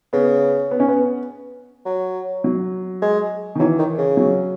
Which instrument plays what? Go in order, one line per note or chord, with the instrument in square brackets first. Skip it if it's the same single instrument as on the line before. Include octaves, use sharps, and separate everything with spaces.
[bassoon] C#3 [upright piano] B3
[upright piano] B3
C#4
B3
[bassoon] F#3
[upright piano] F#3
[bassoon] G#3
[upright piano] D#3
[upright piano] E3 [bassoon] F#3
[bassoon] D#3
C#3
[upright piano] F#3